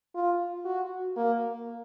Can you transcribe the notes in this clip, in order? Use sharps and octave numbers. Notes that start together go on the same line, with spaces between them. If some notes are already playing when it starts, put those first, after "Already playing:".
F4
F#4
A#3